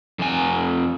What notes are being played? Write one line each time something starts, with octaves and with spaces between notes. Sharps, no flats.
F2 G#5